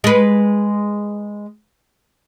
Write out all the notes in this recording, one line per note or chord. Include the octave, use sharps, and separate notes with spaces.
G#3 B4